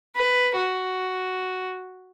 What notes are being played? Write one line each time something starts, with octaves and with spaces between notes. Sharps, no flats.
B4
F#4